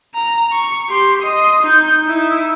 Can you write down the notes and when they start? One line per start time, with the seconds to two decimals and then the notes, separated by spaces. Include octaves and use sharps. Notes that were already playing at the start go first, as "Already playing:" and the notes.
0.14 A#5
0.52 C#6
0.89 G4 C6
1.22 D#5 C6
1.63 D#4 G6
2.04 D#4 E4